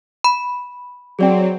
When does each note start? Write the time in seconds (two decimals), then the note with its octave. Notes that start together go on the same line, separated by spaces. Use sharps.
0.24 B5
1.19 F#3 C4 G#4 D5 G5